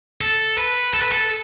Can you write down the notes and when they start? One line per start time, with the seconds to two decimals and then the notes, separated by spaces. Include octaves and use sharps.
0.21 A4
0.58 B4
0.94 A4
1.02 B4
1.12 A4